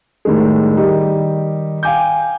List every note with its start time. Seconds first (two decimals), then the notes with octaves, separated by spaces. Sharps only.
0.25 A2 D#3 G3 G#3
0.77 D#3 G3 D#4 G4
1.83 F5 G5 G#5 D6 G6